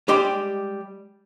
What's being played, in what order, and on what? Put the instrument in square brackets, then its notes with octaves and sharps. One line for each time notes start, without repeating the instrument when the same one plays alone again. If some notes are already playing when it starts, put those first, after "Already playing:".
[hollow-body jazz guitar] G3 G#3 G4 G5 C6